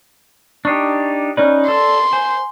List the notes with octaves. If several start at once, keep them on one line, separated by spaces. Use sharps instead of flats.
D4 D#4 G4 C#6 C7
C#4 D#4 B4 D5
A4 C6
C5 G#5